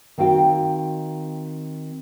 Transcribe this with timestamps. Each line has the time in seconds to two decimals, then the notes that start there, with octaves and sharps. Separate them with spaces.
0.18 D#3 C4 F#4 F5 G5